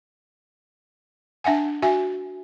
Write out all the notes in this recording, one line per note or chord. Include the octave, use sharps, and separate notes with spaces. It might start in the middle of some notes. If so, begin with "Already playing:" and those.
D4 E5 F#5 G#5
F#4 E5 G#5